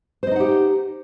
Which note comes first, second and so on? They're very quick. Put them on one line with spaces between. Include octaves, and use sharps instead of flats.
C5 D#5 D#4 F#5 G4